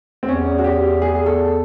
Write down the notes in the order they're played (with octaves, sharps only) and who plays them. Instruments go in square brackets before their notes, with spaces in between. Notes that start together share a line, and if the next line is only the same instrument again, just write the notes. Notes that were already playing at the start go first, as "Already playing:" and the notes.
[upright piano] C4
[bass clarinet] E2 [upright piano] C#4
[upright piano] F#4
G4
G#4
G#4
A4